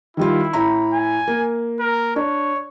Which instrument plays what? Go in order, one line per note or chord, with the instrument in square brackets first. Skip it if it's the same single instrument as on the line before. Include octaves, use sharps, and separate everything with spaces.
[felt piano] D#3 G3 F4 [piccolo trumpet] E4
[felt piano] A2 A#5 B5
[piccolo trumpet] G#5
[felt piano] A#3
[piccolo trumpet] A#4
[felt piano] D4 [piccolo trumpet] C#5